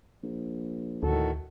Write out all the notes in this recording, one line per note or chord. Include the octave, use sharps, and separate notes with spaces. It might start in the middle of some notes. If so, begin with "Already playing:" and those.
A#1
D2 A2 D#3 F#4 A4